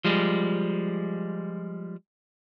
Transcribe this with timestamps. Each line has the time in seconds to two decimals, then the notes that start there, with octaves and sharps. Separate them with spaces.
0.05 F3 G3 G#3